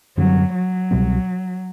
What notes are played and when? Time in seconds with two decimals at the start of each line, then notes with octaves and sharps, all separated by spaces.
0.17 F#2 D3 F#3 G3 C4
0.54 F#3
0.91 C2 B2 G3 C4